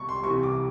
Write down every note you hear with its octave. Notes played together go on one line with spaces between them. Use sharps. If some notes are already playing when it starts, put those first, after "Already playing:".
Already playing: C2 B2 C#6
C6
C2 C3 E3 C#6
D6